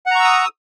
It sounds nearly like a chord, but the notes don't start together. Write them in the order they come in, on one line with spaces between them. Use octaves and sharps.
F#5 A#5 C#6 E6 D#6